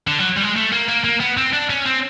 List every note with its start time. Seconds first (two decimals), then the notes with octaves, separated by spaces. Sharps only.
0.07 D3
0.19 F#3
0.37 G3
0.43 G#3
0.56 A3
0.72 A#3
0.88 A#3
1.04 A#3
1.20 B3
1.37 C4
1.53 D4
1.70 C#4
1.86 C4